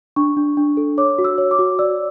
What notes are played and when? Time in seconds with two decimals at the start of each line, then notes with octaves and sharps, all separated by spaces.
0.16 D4 C#6
0.37 D4
0.57 D4
0.77 A4
0.98 C#5 D6
1.18 F#4
1.24 E6
1.38 C#5
1.51 D6
1.59 F#4
1.79 D5 E6